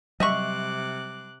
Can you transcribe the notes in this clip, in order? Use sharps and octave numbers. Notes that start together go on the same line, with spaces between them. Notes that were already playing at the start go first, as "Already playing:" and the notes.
C3 F#3 G3 D#5 E5 C#6 D6 F#6